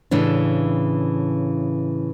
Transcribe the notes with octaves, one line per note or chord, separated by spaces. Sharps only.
A2 C#3 E3 D4